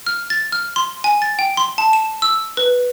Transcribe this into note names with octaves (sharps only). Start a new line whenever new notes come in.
F6
A6
F6
C6
G#5
A6
G5
C6
A5
E7
E6
B4